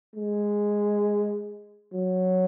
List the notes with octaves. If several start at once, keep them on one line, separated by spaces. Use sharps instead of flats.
G#3
F#3